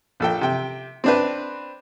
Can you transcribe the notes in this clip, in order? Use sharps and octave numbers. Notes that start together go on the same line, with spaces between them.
A#1 A4 G5
C3 G5
C4 D4 B4